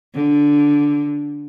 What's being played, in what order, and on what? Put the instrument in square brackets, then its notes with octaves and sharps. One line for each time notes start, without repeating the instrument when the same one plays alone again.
[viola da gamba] D3